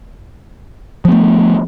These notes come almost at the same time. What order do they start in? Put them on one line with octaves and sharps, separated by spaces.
F3 B3 A3